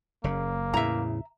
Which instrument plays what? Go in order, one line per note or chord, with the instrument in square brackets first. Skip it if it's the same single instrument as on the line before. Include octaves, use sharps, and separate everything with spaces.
[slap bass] F#1 C#3 [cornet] A#3
[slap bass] E2 C#3 [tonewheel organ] A2 E4 [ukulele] E5 A#5